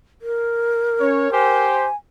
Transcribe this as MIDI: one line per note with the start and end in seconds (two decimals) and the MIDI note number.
0.21 1.65 70
1.00 1.31 61
1.00 1.28 73
1.32 1.88 67
1.32 1.88 72
1.32 1.95 80